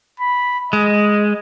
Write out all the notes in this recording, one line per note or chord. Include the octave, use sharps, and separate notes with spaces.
B5
G#3 D#5